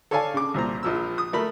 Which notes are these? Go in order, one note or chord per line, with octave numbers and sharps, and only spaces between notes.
A4 C#5 D5 F5 G#5 A5
C#3 D6
C2 A#2 C5 A#5
A#1 F3 E6
D#6
A3 A#4 B5